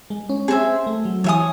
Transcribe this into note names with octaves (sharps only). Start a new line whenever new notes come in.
G#3
C#4
C4 G#4 C5 E5
A3
F#3
E3 C#5 E5 G#5 D#6